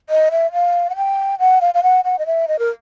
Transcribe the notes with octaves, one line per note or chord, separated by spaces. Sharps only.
D#5
E5
F5
F#5
G5
F#5
F5
F5
F#5
F#5
D#5
E5
D#5
A#4